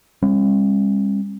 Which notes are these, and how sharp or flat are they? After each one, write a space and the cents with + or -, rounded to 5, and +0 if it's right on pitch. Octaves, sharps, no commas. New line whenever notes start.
G3 +45 C#4 -45